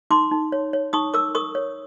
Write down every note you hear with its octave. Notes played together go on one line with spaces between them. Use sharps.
D#4 C6 D6
D#4
C#5
C#5
D#4 C#6 D#6
A#4 D6 E6
A#4 C#6 D#6
C#5